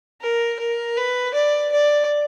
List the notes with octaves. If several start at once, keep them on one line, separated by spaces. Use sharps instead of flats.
A#4
A#4
B4
D5
D5